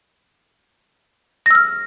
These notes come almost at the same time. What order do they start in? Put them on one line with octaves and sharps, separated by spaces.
A#6 E6 F6